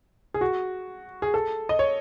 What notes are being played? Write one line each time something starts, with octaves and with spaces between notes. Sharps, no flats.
G#4
F#4
G#4
A4
D#5
C#5